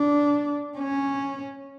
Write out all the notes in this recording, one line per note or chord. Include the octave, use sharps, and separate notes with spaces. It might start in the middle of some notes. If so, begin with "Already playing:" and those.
Already playing: D4
C#4